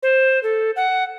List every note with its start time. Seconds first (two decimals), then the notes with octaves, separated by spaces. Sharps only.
0.03 C5
0.43 A4
0.76 F#5